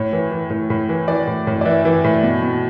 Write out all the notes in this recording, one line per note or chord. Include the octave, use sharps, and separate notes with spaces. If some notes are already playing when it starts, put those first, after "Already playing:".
Already playing: A2 C#5
E3
E3
A2
A2
E3
E3 D5
A2
A2
D5
E3 E5
E3
A2
B2
B2